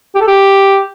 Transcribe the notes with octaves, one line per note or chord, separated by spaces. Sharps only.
G4
A4
G4